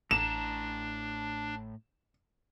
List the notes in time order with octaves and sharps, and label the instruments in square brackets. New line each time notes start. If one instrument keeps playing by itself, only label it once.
[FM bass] A1 [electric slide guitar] A2 F#5 A#5 [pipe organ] D4 [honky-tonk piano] E7